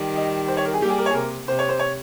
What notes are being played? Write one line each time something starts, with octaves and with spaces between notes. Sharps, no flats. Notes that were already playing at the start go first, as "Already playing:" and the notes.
Already playing: D#3 G3
D#5
C5
C#5
A#4
G#4
G3 A#3 G4
G#4
A#4
C#5
G#4
C3 A#4
C3 C5
C#5
C5
C#5